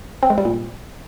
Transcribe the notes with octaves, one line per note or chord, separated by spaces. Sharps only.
C4
G#3
G3
A#2